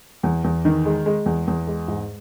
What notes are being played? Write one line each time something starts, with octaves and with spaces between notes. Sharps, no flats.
E2
E2
D#3
G#3
G#3
E2
E2
G#3
G#2